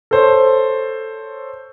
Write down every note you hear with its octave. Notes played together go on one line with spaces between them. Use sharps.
A4 C5 C#5